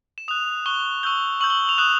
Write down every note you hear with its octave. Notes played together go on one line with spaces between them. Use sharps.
E7
D#6 F#6 F7
C#6 F#6 G7
C#6 E6 G6 G7
C#6 E6 G6 F#7
G7
F7
D#6 F#6 E7